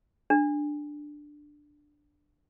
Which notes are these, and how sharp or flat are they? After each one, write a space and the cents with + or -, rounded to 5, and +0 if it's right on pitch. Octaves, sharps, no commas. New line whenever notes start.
D4 +10